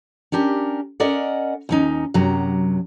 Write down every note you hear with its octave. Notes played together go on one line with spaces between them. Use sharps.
C#4 D4 G4 A#4
C#4 A#4 D5 D#5 F#5
D#2 C#4 D#4
F#2 C3 F#3 A#5